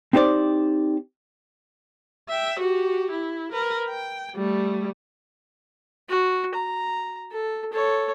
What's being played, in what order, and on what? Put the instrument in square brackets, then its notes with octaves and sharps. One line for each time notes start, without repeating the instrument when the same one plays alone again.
[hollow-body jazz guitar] C4 D#4 G4 C5 D5
[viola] E5 G5
F#4 G4
E4
A#4 B4
G5
G3 A3
[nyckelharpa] F#4
A#5
A4
A4 C#5